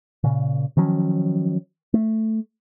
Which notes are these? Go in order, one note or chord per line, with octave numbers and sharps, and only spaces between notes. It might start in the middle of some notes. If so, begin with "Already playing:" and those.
A#2 C#3
D#3 F3 F#3 C#4
A3